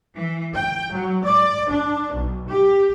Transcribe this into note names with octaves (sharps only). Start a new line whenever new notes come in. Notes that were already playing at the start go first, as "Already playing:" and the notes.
E3
G5
F#3
D5
D4
B1
G4